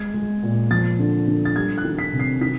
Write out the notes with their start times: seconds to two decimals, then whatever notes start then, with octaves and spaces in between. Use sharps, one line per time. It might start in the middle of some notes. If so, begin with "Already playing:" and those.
Already playing: G#3 G#6
0.14 G#3
0.43 A#2
0.70 F3 A6
0.99 D3
1.28 D3
1.45 A6
1.56 G3 G#6
1.78 F#6
1.84 D#3
1.99 B6
2.13 C3
2.19 C7
2.41 D#3 B6